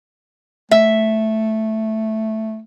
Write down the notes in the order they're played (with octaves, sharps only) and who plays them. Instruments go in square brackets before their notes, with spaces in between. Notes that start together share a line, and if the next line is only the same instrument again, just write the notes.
[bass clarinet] A3 [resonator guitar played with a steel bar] E5